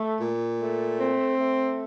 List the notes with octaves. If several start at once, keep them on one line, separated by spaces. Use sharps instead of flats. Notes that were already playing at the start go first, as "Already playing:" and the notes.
Already playing: A3
A#2
A3
C4
A3